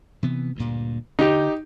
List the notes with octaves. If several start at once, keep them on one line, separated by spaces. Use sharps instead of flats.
C3 E3 B3
D2 G2 A#2
D3 D#4 G4